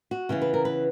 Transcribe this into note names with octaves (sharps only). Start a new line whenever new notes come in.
F#4
C#3 E3 B3 E4
B4
A#4
B4